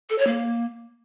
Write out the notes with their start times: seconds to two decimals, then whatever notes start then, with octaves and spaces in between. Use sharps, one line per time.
0.10 A4
0.18 C#5
0.27 A#3